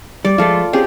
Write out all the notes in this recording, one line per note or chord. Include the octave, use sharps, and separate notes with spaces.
G3 D5
F3 G#3 A3 F4 A4
C4 C#4 G4 G#4